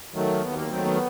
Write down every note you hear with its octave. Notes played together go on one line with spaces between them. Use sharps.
D#3 F#3 A3
D#2 B3
A#3
D#3 F#3 A3 C4
B3